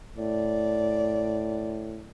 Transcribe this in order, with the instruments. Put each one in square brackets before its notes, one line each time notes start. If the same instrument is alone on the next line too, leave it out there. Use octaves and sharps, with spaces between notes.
[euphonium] A2 [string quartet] D5